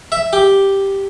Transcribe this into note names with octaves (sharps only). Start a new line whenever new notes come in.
E5
G4